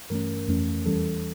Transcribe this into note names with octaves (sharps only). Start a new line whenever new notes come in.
G2 E3 A3 C#4 A#4
F2 E3 A3 C#4
E2 E3 G3 C#4 A4